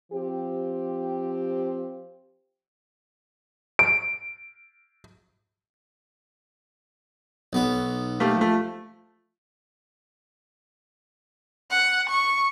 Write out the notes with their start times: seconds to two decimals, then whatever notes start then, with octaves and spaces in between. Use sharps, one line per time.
0.12 F3 C4 G4
3.79 D7
7.53 B1 B3
8.20 A3 A#3 G4
8.37 F3 A3
11.70 F#5
12.10 C#6